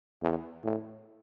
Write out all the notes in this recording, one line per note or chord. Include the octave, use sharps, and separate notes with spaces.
E2
A2